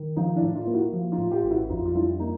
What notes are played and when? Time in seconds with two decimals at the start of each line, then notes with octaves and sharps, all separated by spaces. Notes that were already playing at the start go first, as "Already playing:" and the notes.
Already playing: D#3
0.17 F3 D#4
0.36 D4 E4
0.42 A2
0.55 D#4 F4
0.67 A#3
0.73 E4 F#4
0.93 F3
1.12 D#4 F4
1.18 A2
1.31 F4 G4
1.44 A1
1.51 E4 F#4
1.69 F2 D#4 F4
1.86 F4
1.95 G3 D4 E4
2.20 A#3 D#4